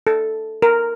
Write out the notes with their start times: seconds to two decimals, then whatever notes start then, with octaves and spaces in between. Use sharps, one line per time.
0.07 A4
0.62 A#4